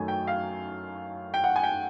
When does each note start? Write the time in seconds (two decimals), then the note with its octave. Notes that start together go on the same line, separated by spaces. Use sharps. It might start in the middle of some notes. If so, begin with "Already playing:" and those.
Already playing: F#2 D#3 F#3 A3 G#5
0.08 G5
0.27 F5
1.34 G5
1.44 F#5
1.56 G#5
1.63 G5